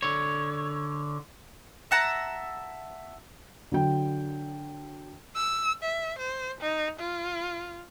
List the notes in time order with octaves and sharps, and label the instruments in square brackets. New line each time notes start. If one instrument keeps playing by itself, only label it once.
[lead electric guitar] D3 C#5
[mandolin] E5 F#5 A5 A#5
[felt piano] D3 F#3 G5
[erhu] E6
E5
C5
D#4
F4